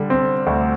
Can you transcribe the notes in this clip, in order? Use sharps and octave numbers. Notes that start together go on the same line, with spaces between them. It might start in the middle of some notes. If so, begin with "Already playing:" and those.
Already playing: D3 G3
C4
D2